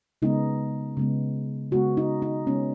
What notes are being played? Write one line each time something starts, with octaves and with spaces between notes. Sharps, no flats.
C#3 G#3 B3 D#4
C#3 G#3 B3
C#3 G#3 B3 F#4
D#4
D#4
C#3 G#3 B3 C#4